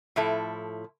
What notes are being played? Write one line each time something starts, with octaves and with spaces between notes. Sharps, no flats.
A2 F3 E4 A4